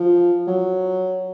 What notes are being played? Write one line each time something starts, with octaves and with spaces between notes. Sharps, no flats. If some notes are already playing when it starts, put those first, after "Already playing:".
Already playing: F3
F#3